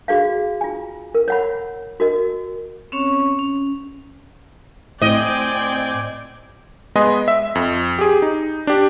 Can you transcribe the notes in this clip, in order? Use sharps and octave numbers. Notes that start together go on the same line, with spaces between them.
F#4 G#4 D5 F5
F4 G#5
A#4
C#5 F#5 B5
F#4 A#4 D#5
C4 C#4 C#5 C#6
C#4
A2 C4 D5 D#5 G5 G#5
G#3 B3 B4 D#5 G#5 C6
E5
F2
G4 G#4
D#4
D4 G4